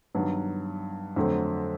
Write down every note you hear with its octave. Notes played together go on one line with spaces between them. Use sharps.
G2 D#3 F#3 B3
F2 D3 F#3 A3 C4